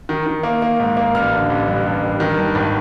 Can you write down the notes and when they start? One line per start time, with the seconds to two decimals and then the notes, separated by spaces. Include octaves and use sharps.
0.09 D#3
0.27 D#3
0.43 A#3
0.62 A#3
0.79 G#2
0.97 A#3
1.14 A1 F6
1.33 D3
1.50 A1
1.67 G2
1.86 A1
2.03 G2
2.20 D#3
2.38 G2
2.55 G#1